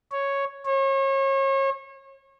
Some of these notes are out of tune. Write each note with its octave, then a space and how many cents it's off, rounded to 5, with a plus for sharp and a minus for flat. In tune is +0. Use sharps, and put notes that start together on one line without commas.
C#5 +0
C#5 -35